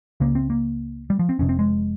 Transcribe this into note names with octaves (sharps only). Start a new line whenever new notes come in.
C#2 C#3 A#3
C4
A#3
G3
F3
C4
F1 F2 C3 C#4
C4
G#3